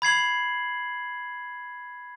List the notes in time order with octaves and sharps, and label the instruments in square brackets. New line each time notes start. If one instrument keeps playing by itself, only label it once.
[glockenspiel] B5 G#6 C7 F#7